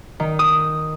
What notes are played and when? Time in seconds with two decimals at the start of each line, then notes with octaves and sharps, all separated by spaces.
0.20 D#3
0.39 D#6